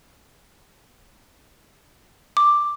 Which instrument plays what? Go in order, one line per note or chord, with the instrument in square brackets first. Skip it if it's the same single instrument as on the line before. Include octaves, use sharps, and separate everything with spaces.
[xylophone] D6